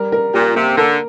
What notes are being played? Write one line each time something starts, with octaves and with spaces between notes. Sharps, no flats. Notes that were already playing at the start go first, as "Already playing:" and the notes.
Already playing: G3 A#4
A#4
A#2 G4
C3 A#3
D3 A#4